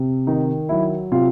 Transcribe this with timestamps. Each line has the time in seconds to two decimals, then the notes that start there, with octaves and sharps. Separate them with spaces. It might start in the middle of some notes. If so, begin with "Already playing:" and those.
Already playing: C3
0.27 D#3 D#4
0.69 F#3 E4
1.12 C3 F4